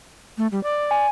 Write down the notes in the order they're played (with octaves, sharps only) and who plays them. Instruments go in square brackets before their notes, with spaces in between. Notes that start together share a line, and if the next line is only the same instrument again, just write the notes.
[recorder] A3
G3
D5
[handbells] G#5